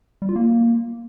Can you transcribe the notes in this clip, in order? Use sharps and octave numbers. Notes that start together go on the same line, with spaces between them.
G3
F4
A#3